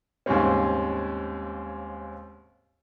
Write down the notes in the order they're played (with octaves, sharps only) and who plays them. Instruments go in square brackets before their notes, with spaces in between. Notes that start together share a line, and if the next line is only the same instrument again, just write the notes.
[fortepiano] D#2 G#2 C#3 G3 C4 C#4